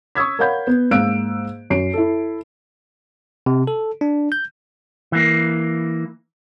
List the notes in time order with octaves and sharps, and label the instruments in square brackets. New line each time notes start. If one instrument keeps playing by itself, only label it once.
[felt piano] C#6 D#6 E6 G#6 B6
A#4 C#5 F5 F#5 B5 G6
B3
G#2 A#3 F5 E6 F#6 D7
F#2 C7 D7
E4 A4
[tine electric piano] C3
A4
D4
G6
[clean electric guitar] E3 A#3